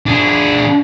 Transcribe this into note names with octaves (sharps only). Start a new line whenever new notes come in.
D4 G#4